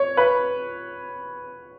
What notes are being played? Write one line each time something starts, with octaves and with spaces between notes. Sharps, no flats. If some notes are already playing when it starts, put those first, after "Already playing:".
Already playing: C#5
B4